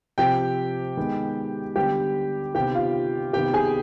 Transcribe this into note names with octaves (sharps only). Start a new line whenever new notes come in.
C3 F3 C4 G4 G5
D#3 G#3 B3
D3 G3 B3 G4 G5
C3 D#3 B3 G4 G5
F4 F5
C3 D#3 B3 G4 G5
G#4 G#5